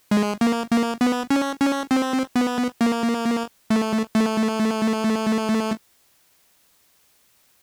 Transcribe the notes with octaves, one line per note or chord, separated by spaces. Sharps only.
G#3
A#3
A#3
B3
C#4
C#4
C4
B3
A#3
A3
A3